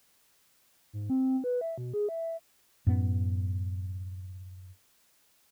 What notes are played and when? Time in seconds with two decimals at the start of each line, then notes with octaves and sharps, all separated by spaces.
0.93 G#2
1.10 C4
1.44 B4
1.61 E5
1.78 B2
1.94 G#4
2.09 E5
2.87 F#2 A2 B3